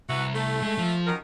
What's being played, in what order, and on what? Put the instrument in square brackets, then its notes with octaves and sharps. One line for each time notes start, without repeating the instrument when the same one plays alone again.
[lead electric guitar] C2 [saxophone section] F#4 B4 E5
[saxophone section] A3
[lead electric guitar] G#3
F3
[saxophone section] F#2 D#3 A#4